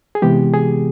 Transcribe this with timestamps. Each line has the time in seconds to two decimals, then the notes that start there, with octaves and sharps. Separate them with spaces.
0.15 G#4
0.22 C3 E3 G#3 B3 G4
0.54 G#4